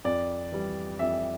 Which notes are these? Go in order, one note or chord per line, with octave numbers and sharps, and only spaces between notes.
F2 D5
E3 G3
F2 E5